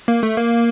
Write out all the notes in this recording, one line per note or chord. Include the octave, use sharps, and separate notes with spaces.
A#3
A3
A#3